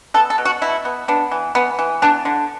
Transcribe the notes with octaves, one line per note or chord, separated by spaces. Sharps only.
B3 A4
A4
B2
F#4
B2 E4
B3
B3 D4
E3
E3 B3
E3
B3 D4
D3